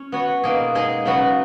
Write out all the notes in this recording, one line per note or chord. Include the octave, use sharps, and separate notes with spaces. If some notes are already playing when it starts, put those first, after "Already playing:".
Already playing: C#4
B3 F#4 C#5
B2 A#3 D#4 G#4
G#3 D#4 G#4 D#5
C#3 F#3 B3 F#4